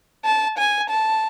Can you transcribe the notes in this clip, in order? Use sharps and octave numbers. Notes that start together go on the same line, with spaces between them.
A5
G#5
A5